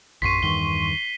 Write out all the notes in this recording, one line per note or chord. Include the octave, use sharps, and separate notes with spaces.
A#1 F#2 C6 C#6 B6 C7 D#7
E2 G2 D#3 G7